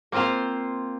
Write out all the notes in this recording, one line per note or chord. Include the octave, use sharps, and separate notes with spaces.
A#3 C4 F4 C5 F5